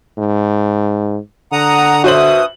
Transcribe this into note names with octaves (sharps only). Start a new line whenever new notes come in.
G#2
D3 F#5 A#5 D#6
G2 B2 F#4 C5 E5 D#6 F#7